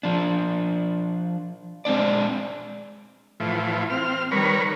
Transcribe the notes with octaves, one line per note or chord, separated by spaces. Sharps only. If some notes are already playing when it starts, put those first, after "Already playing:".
F3 D4
G#3 C4 D4 D5
A2 E3 F3
C4 F6
D#3 G3 A#4 B4 C#5